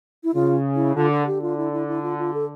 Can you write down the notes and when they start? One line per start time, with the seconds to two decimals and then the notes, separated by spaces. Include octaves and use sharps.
0.24 E4
0.34 C#3 F4
0.75 E4
0.95 D3 F4
1.11 A4
1.27 D3 G4
1.42 F4
1.57 E4
1.73 E4
1.88 E4
2.03 F4
2.19 F4
2.34 A4